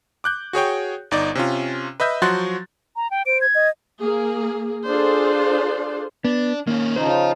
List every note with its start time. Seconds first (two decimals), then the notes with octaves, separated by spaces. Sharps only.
0.24 D6 F#6 G6
0.53 F#4 G#4 C#5 G5
1.11 G1 D#4 D5 D#5
1.35 C3 C#4 F4
2.00 B4 D#5 E5 G6
2.22 F3 F#3 F#4 C6 F#6 A6
2.96 A#5
3.11 G5
3.26 C5 D7
3.41 G#6
3.55 D#5
4.01 A#3 G#4
4.86 D4 F4 G#4 A4 C5
6.24 B3 D4
6.67 D#3 A#3 C#4
6.96 C#3 F3 D#4 C5
7.09 F4